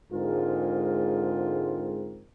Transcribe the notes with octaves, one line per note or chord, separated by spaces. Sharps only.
G#2 D3 G#3 C4 F4 A#4